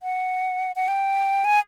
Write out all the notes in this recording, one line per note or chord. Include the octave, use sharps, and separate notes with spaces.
F#5
F#5
G5
G#5